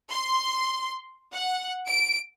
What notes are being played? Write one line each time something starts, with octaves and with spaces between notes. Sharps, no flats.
C6
F#5
D7